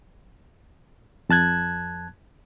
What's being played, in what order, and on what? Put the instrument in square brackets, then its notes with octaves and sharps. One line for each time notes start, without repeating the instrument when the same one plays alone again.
[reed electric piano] F2 A5 F#6 G#6